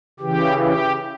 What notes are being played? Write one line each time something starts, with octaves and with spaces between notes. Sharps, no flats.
C#3 E3 G4
G4